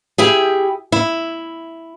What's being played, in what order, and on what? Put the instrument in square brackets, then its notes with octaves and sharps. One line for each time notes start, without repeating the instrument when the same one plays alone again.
[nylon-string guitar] E4 G4 G#4
E4